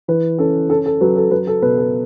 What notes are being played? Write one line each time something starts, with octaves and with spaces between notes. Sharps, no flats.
E3 B4
C#4 A4
C#4 A4
A4
F#3 B4
A4
F#3 B4
A4
B2 B4
A4